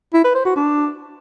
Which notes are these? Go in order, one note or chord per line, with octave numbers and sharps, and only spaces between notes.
E4
B4
C5
F#4
D4